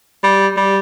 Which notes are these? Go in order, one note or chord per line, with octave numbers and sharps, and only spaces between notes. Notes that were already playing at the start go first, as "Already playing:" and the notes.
G3
G3